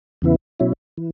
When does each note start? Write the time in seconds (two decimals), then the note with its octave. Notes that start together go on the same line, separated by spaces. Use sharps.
0.22 E2 C#3 E3 B3 E4
0.60 B2 F#3 C#4 E4
0.98 E3